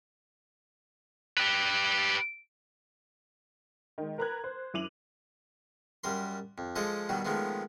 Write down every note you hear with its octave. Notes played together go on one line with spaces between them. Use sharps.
G4 B4
D#3 G#3
A#4 B4 A#5 B5 F#6 G#6
C5
F#2 E4 D6 D#7 F7 F#7
F#2 G3 A#4 C6
F2
F3 G#3 A4 C#5 D#5
B2 D#3 F#3 G3
D#3 F3 G#3 A3 B3